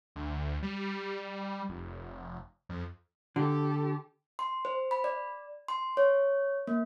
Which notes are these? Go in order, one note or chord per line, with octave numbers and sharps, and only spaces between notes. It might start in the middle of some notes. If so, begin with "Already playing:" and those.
D2
G3
F1
F2
D3 G4 A4
C6
C5
B5
D5
C6
C#5
A#3